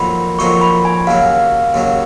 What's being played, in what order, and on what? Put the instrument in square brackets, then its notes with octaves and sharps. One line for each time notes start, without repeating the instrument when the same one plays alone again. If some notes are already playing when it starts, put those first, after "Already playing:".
Already playing: [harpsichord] F2 D#3 F#3 A#3 D#4 [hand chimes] B5
[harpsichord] F2 D#3 F#3 A#3 D#4 [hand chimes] C#6
[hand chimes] B5
G#5
[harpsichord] D#2 C#3 F#3 [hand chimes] F5
[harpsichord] D#2 C#3 F#3